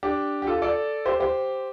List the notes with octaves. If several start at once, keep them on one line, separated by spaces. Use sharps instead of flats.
D4 G4
G4
F4 A4
A4 D5
G4 C5
G4 C5